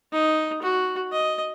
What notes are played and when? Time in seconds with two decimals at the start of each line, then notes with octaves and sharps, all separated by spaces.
0.13 D#4
0.62 F#4
1.12 D#5